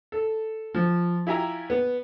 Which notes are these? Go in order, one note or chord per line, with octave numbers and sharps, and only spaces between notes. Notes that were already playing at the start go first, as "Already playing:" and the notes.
A4
F3
E4 F4 G4 E5 G#5 A#5
B3